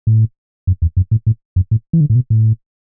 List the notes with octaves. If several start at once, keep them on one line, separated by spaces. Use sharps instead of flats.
A2
F#2
E2
F#2
A2
A2
F#2
A2
E3
D3
A2
B2
A2